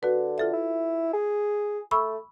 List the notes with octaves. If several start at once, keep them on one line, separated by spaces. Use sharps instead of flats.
D3 F#4 B4
F4 A4 E5
E4
G#4
A3 B5 C#6 E6